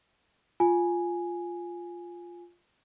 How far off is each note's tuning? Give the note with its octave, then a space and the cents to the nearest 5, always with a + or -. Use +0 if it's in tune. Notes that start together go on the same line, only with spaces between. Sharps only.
F4 +0 G#5 +0